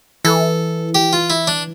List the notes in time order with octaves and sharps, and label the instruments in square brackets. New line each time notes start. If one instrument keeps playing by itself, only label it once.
[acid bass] E3 [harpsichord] A4
[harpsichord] G4
F4
E4
D4